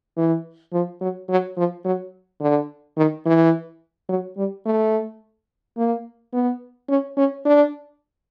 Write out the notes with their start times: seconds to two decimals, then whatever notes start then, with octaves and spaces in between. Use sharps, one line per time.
0.17 E3
0.73 F3
1.01 F#3
1.29 F#3
1.57 F3
1.85 F#3
2.41 D3
2.97 D#3
3.25 E3
4.09 F#3
4.37 G3
4.66 A3
5.77 A#3
6.33 B3
6.89 C#4
7.17 C#4
7.46 D4